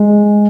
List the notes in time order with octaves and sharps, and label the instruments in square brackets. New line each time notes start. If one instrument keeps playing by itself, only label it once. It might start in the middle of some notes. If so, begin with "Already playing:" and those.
Already playing: [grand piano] G#3